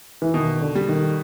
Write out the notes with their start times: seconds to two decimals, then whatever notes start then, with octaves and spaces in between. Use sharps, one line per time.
0.22 E3
0.34 B2 D#3
0.61 D3
0.75 G3
0.89 D#3